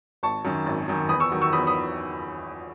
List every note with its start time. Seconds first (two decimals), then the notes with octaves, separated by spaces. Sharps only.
0.23 G#1 A5 C#6
0.45 F#2 D#3
0.66 G#1
0.88 F#2 D#3
1.09 E2 B5 D#6
1.20 C#6 E6
1.32 D#3 F#3
1.42 C#6 E6
1.52 E2 B5 D#6
1.67 B5 D#6